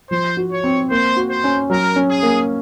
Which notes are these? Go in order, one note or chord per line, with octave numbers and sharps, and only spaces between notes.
F3 C5
F#4
C#5
C4
A#3 C5
F#4
C5
C#4
F#3 A#4
C#4
G#4
A#3